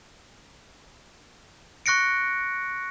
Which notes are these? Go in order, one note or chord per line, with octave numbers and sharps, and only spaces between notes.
C#6 F#6 A#6 C#7 D7